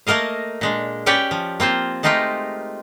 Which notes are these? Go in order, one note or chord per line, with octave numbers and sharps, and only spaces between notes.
A3 A#3 A#4 D#5 F5
A#2 G#3 D4
C#4 G4 B4 C#5 D5 G5
F3
A#3 C4 F4 C5
G#3 A3 D#4 F4 G4 A#4